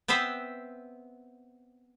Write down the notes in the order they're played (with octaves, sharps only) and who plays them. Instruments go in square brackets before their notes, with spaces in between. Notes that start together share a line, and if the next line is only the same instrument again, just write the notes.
[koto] B3 C4 B4 C5 E5